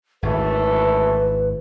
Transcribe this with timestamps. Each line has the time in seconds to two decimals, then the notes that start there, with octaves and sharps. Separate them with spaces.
0.23 G#1 F#2 E3 A3 B4